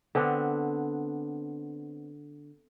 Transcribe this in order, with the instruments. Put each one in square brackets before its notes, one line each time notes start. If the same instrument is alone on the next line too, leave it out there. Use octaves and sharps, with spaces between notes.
[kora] D3 B3 C4 D4